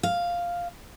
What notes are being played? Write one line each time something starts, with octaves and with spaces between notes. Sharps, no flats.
F5